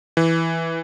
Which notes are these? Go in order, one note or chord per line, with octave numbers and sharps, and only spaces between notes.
E3